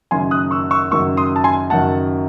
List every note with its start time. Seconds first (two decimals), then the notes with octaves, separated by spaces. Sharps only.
0.11 F#1 F#2 D#3 F#3 G#5 C6
0.31 D#6 F#6
0.51 C#6 E6
0.71 C#6 E6
0.91 F#1 F#2 D#3 F#3 C#6 E6
1.17 C6 D#6
1.36 A5
1.44 G#5 C6
1.70 F#1 F#2 D#3 F#3 F#5 A5